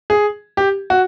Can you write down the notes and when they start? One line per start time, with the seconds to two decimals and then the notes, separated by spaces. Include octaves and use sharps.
0.10 G#4
0.57 G4
0.90 F#4